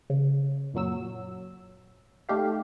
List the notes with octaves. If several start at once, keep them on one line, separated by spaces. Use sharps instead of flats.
C#3
F#2 A#2 F#3 E6
A3 D#4 G4 F5